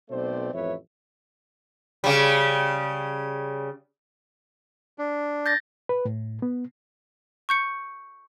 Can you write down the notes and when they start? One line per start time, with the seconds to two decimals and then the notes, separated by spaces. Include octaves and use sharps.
0.10 B1 B2 A3 C4 C5 D5
0.53 A1 F2 B4 C#5 E5
2.04 C#3 G3
4.98 D4
5.46 G6 A6 A#6
5.89 B4
6.05 A2
6.42 B3
7.49 C#6 G6 C#7